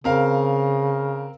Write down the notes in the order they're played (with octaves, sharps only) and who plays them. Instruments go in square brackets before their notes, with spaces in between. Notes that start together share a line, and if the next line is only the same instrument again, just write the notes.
[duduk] C#3 [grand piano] C4 A#4 F5